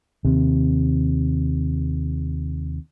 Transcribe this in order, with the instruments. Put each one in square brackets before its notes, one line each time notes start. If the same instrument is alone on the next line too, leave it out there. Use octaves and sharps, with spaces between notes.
[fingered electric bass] D#2 C3